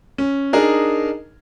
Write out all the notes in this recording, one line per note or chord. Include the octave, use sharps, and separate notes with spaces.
C#4
D4 D#4 G#4 A#4